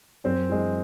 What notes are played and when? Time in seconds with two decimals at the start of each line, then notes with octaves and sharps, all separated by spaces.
0.24 F#2 C4
0.49 E3 G#3